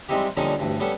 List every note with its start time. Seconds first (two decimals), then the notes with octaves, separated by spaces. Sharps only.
0.09 G3 G#3 C4 D#4 E4 G4
0.37 A#2 D3 F3 G3 C#4 D#4
0.59 A1 D2 G2
0.80 G3 B3 C#4 A4